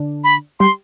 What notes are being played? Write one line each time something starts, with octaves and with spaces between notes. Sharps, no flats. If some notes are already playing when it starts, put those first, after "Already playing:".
Already playing: D3 D4
B5
G3 G4 C6